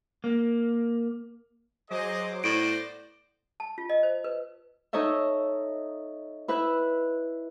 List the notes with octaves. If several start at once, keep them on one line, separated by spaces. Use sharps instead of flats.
A#3
F#3 G#4 C5 D#5 D6
A2 B3 C5 D5 A#6 D7
A5
F4
D#5
C5
B4
D#4 A4 C#5 D#5 E5
E4 B4 E5 B5 F#6